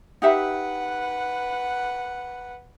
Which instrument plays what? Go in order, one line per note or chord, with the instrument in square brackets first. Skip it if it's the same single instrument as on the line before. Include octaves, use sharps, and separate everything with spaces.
[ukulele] D#4 G4 E5 [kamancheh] B4 F#5